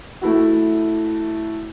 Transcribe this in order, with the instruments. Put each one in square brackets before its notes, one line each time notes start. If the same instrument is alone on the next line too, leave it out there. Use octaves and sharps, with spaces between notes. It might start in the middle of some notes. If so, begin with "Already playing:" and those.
[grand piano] A3 E4 F#4